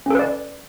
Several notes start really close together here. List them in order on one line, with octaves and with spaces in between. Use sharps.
C#4 A4 B4 D5